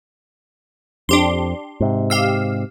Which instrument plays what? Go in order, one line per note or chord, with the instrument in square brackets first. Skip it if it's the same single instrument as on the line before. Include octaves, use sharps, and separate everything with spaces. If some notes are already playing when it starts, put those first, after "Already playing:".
[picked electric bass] F2 [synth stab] D4 G4 C6
[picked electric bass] G#2 C3
[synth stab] G4 F5 E6